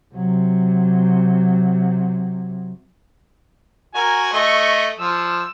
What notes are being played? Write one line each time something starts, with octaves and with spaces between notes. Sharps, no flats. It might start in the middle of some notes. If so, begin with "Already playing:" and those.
C3 F#3
F#4 A#4 G#5
A3 D#5 C#6
F3 E6